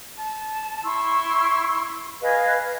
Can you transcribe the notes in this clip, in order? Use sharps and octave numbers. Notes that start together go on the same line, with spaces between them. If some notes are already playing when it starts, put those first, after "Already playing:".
A5
E4 C6 C#6 E6
G#4 B4 D#5 F5